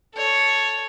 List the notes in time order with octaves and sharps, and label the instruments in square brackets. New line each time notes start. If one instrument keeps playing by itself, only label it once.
[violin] A4 C#5